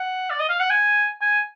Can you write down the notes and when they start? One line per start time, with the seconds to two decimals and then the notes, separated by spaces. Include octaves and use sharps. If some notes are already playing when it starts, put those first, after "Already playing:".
Already playing: F#5
0.30 D5
0.39 D#5
0.49 F5
0.60 F#5
0.70 G#5
1.21 G#5